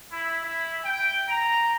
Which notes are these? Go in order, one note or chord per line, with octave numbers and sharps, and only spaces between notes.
E4
E4
G5
A#5